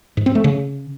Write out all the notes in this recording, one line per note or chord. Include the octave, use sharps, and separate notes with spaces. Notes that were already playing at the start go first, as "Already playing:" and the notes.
G#2
C4
A3
C#3